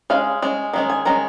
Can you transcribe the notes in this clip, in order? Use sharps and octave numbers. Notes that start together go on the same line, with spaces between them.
G#3 C#4 F5
G#3 C#4
D#3 G#3 C#4
G#5
D#3 G#3 C#4 A#5